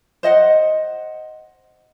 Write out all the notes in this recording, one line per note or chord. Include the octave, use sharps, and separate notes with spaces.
C5 D#5 F#5